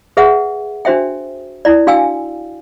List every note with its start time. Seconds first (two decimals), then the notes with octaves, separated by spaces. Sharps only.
0.17 G#4 B4 E5 F#5
0.85 D4 F#4 C5 E5 G5
1.65 E4 D5
1.87 D4 F#4 F5 G5 G#5 E6